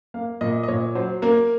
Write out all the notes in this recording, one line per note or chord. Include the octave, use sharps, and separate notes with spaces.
A#3 F5
A#2 D#5
D#5
A#2 C#5
F#3 C5
A#3 A#4